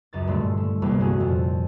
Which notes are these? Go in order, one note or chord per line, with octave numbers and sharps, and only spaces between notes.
C#2 F#2 A6
G2 A#2 D3 A3 C6
A3
E1 C2 G2 G#3 A#3 B3
G#3 A3 C#4 F#4 G#4
F2 A#2